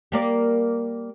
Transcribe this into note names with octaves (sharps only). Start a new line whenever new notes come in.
G3 A#3 D5